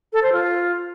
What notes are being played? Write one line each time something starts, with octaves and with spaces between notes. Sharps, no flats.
A4
C5
F4